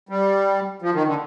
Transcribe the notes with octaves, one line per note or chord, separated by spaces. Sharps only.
G3
F3
D#3
D3